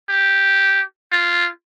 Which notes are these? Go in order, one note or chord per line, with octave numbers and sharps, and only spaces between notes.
G4
F4